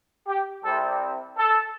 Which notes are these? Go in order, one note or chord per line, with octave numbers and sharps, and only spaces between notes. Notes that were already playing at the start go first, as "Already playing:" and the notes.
G4
C2 C3 G3 C4 A4
A4